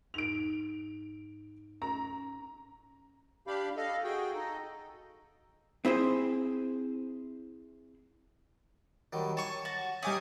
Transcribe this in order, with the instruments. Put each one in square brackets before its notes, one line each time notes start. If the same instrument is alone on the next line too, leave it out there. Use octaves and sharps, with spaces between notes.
[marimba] G#2 D#4 [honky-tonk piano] D7 F7
[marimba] C#4 [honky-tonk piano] A#5
[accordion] D4 G4 F5 B5
A4 D#5 F5
F#4 G#4 G5
D#4 A4 D#5
[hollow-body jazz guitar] C4 E4 G#4 C5
[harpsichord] D#3 F#3 G3
[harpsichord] C#5 G#5 [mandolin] A5 C#6
[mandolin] F#4 A5
[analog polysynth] G3 G#5 D#6 [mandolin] A3 D6 [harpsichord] C#4 D#4